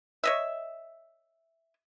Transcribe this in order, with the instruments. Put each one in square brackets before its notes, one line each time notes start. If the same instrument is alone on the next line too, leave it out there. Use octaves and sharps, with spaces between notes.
[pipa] C#5 D#5 E5